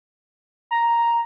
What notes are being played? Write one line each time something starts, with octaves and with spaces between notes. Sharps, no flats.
A#5